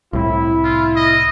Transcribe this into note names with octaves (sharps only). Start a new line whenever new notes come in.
C2 A2 E4
F4
D#5